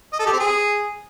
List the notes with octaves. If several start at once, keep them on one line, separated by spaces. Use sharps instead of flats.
D#5
A4
G4
C4
G#4